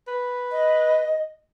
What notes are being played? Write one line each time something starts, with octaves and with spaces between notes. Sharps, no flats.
B4
D#5